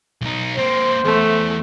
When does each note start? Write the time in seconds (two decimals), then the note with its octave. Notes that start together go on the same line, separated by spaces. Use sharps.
0.21 B1 D#4
0.56 A#3 C4 C5
1.05 E2 A3